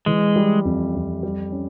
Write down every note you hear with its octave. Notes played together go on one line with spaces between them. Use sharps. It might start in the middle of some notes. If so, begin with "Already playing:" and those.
E3 G#3
G3
F2
F2
G3
C#4